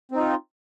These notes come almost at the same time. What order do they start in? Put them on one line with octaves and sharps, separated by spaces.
C4 D#4 F4